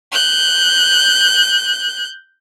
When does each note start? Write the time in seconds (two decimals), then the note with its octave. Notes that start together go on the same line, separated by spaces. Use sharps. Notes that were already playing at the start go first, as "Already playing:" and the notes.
0.12 F#6 G6